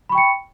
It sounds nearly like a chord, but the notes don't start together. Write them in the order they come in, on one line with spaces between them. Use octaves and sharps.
B5 C#6 G5 C#7